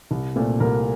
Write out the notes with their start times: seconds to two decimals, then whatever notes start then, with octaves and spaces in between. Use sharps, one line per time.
0.11 C2
0.36 A#2 A3 C4
0.60 C2 A#4